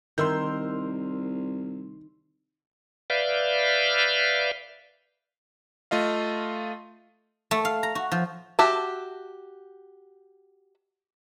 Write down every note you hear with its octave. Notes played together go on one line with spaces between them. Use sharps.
C2 D#3 E4 A#4 C6 E6 G6
B4 D5 E5 F5 F6 G6
A3 F4 D#5 F5
A3
F5
A#5
F#4
F3
F#4 G4 E5 A5